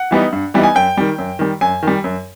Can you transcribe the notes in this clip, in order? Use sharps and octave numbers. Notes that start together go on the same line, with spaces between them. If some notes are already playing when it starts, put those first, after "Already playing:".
Already playing: F#5
E3 G3 B3 D#4
G2
E3 G3 B3 D#4
G#5
F#2 G5
D#3 G3
F#2
D#3 G3
F#2 G#5
D#3 G3
F#2